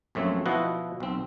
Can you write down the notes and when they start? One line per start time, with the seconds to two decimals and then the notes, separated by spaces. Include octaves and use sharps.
0.15 A#1 F#2 A3 C4 C#5
0.46 B2 F3 E4 F#4 D#5 F#5
1.00 B1 C4